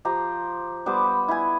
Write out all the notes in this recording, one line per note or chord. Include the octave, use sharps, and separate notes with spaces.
F3 G4 A#5 C6
G3 B3 C5 D6
B5
E4 G#5